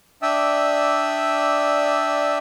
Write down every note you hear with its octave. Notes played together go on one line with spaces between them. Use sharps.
D4 D5 E5 G5 D#6 E6